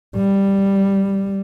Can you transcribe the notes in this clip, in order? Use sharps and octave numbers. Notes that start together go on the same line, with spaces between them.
G3